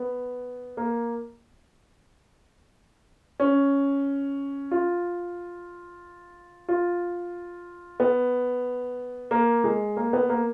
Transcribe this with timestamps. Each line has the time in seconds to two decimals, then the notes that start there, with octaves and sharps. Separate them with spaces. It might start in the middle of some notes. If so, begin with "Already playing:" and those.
Already playing: B3
0.77 A#3
3.40 C#4
4.71 F4
6.68 F4
8.00 B3
9.31 A#3
9.64 G#3
9.97 A#3
10.13 B3
10.29 A#3